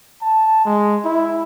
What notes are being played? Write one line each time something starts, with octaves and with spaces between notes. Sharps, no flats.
A5
G#3
E4